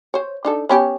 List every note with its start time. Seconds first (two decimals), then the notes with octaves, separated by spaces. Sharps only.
0.14 C5 C#5
0.45 D4 D#4 A4
0.69 B3 C#4 G4